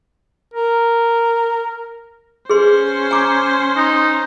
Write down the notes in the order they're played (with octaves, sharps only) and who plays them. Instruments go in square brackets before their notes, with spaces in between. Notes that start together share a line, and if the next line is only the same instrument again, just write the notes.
[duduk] A#4
[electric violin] C#4 C5 [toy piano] G#4 B4 C6
[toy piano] G#5 A#5 D6
[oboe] D#4